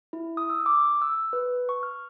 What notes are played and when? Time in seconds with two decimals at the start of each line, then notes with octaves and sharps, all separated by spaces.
0.13 E4
0.37 D#6
0.50 E6
0.66 D6
1.02 E6
1.33 B4
1.69 C#6
1.83 F6